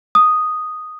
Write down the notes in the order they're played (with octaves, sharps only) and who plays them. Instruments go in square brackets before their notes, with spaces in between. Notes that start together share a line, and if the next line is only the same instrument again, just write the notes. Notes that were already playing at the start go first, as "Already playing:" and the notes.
[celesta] D#6